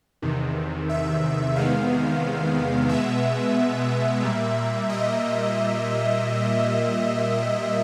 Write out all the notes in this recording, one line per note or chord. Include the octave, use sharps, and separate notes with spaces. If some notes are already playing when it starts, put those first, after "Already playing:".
E2 C3 D#3
E5
E2 C3 D#3 G#3 B3 F5
B2 G#3 B3 E5
A#2 G3 A#3
D#5